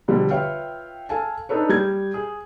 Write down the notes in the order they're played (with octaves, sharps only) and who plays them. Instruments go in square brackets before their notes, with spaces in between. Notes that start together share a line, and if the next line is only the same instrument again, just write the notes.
[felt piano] B2 D3 F3 G3
F4 B4 C#5 E5 F5 G5
A4 F5 G#5 A5
D4 D#4 A4 B4 C#5
G3 G6 G#6
G#4